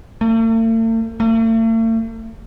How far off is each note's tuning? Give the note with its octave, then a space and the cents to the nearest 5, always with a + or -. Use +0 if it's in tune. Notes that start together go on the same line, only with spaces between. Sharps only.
A3 +45
A3 +45